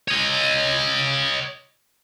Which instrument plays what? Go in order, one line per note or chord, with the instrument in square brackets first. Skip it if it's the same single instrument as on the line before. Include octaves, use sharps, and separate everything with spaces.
[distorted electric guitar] C#5 D#5